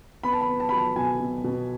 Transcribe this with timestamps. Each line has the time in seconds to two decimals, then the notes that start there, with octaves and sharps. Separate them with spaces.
0.23 B3 B5
0.33 A5
0.41 B5
0.48 B3
0.60 A5
0.69 F#3 B5
0.78 A5
0.96 B2 G#5
1.20 B2
1.44 B2